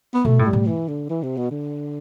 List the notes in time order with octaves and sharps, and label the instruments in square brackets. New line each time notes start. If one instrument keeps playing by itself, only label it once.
[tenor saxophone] B3
[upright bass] B2 [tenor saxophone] A3
[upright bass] A2
[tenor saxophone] G3
[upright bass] A2
[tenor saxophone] E3
D3
E3
C3
B2
D3